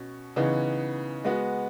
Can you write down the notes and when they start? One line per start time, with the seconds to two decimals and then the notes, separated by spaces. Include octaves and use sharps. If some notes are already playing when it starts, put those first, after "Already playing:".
Already playing: B2 C#4
0.36 C#3 E3 B3 D#4
1.24 G#3 B3 F#4